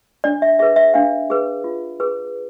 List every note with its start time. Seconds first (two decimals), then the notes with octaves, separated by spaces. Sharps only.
0.24 D4 D5
0.42 E5
0.59 G#4 B4 E5
0.76 E5
0.94 D4 F5
1.30 G#4 B4
1.64 F4
2.00 G#4 B4